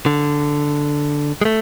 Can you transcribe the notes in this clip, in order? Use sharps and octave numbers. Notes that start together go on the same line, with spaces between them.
D3
G#3
A3